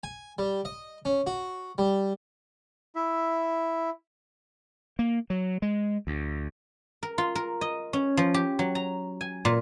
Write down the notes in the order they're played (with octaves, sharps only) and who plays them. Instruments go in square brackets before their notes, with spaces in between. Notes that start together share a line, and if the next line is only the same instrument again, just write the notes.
[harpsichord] G#5
G3
D#5
C#4
F#4
G3
[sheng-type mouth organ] E4 E5
[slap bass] A#3
F#3
G#3
D2
[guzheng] A#4
F4
A#4
D#5
C#4
F3
G4
F#3
A#5
G#5
A#2